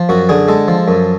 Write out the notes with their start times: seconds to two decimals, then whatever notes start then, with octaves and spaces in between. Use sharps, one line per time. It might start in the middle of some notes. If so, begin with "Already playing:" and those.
Already playing: F3
0.09 F#2 F#4
0.29 D3 G#4
0.48 G#3 A4
0.68 F3
0.88 F#2